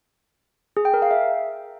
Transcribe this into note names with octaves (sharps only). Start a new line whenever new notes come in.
G#4
G5
A#4
F5
E5